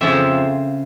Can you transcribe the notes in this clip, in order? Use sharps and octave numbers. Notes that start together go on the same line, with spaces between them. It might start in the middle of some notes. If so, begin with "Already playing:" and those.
F2 C#3 F3 E5